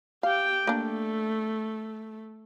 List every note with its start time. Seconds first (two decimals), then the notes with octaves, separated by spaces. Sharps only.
0.23 G4 F5 G5
0.67 A3 A#3 D4